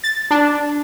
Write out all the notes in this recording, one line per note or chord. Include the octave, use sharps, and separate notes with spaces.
A6
D4